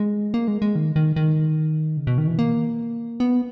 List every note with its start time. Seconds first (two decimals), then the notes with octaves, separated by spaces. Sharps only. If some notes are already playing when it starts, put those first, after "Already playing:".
Already playing: G#3
0.34 A#3
0.48 G#3
0.62 G#3
0.76 D#3
0.96 D#3
1.16 D#3
1.97 C#3
2.07 B2
2.18 D#3
2.27 E3
2.39 A#3
3.20 B3